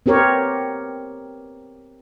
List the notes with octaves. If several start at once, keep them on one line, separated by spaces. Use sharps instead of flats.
B3 C4 G4 A#4 C#5